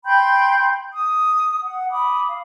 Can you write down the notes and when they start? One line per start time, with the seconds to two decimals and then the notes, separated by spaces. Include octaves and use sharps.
0.04 G5 B5 C6 G6
0.94 D#6
1.62 F#5
1.89 B5 D6 D#6
2.27 F5